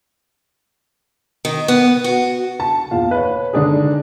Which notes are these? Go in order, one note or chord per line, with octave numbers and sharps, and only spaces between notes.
D#3
B3
F#4
A5
E2 A#2 F5
B4 C#5
D3 G#3 D4 D#4 G#4